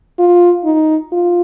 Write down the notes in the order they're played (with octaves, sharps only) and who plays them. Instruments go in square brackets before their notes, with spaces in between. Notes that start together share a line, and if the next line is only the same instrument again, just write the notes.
[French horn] F4
D#4
F4